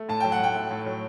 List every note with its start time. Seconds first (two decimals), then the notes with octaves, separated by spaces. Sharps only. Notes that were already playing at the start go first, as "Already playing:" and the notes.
Already playing: A3
0.09 A2 A5
0.20 F#3 G5
0.32 F#5
0.40 A2 G5
0.55 A3
0.71 A2
0.86 F#3